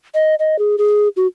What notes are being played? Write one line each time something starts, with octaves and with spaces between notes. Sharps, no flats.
D#5
D#5
G#4
G#4
F#4